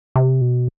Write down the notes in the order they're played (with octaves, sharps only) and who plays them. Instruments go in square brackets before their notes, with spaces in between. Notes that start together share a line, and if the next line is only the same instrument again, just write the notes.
[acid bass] C3
B2